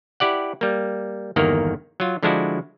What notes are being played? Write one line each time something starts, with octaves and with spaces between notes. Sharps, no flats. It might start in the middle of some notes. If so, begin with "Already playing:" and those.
E4 G4 D5 F#5
G3 A#3
G1 E2 D#3 A#3 A#4
F#3 F4
D3 F3 G#3 D4 E4 F#4